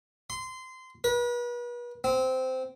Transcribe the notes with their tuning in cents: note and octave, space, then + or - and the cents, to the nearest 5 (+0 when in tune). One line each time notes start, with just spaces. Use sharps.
C6 -20
B4 -40
C4 -15